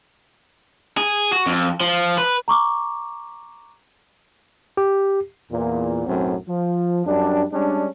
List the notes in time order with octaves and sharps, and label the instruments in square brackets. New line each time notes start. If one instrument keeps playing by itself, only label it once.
[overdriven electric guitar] G#4
F#4
F2
F3
B4
[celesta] A#5 C#6 D6
[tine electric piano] G4
[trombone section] E2 A#2
B1 F#2 A2 F#3 C4
F3
F#2 G3 D4
G3 G#3 C#4 D4